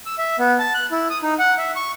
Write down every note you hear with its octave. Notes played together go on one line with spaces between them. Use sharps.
E6
E5
B3
A5
F#6
E4
D#6
D#4
F#5
E5
C#6